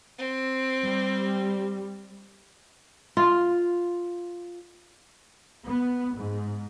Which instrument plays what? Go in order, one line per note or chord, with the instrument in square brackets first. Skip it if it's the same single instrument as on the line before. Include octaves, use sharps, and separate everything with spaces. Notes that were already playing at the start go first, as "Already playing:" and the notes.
[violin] C4
[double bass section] G3
[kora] F4
[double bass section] B3
G#2